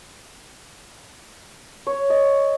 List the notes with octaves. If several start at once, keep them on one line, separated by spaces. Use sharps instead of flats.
C#5
D#5